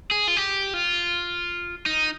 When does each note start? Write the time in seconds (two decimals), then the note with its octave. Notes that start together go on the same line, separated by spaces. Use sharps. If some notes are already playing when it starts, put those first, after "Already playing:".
0.11 G#4
0.28 F4
0.37 G4
0.74 F4
1.86 D#4